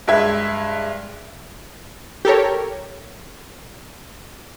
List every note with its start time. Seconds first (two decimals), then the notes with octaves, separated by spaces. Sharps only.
0.08 G2 G#3 E5 G#6
2.25 G4 A4 A#4 C#5